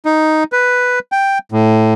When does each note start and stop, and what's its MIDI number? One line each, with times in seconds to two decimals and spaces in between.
0.06 0.44 63
0.52 0.99 71
1.12 1.38 79
1.52 1.94 45